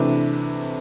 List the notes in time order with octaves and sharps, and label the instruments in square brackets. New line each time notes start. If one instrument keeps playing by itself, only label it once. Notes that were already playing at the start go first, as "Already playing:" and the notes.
Already playing: [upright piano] C3 E3 A3 D4 B4